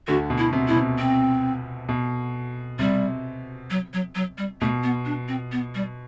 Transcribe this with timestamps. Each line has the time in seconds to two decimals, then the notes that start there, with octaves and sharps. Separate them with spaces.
0.07 D2 D3 F#4
0.30 B2
0.38 E4
0.53 C3
0.68 B2 E4
0.76 C3
0.98 C4
1.89 B2
2.79 C3 G3
3.70 F#3
3.94 F#3
4.15 F#3
4.38 G3
4.61 B2 A3
4.83 B3
5.06 D4
5.28 C4
5.52 B3
5.75 G3